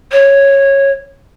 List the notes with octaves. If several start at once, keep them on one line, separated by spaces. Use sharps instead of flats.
C#5